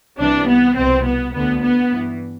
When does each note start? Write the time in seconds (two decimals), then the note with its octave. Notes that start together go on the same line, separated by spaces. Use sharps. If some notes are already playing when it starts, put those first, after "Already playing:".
0.19 C2 C3 E3 D4
0.48 B3
0.77 C2 B2 C4
1.05 B3
1.34 D2 D3 B3
1.63 B3
1.92 G2 E3